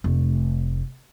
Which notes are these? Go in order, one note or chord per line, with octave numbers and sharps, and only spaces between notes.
F1 A3